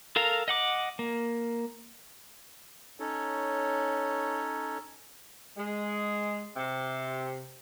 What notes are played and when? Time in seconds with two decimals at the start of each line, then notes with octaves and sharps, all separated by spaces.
0.16 A4 A#4 F5 A#5
0.48 D#5 F#5 D6
0.99 A#3
3.00 C#4 D#4 A4 C#5
5.57 G#3
6.56 C3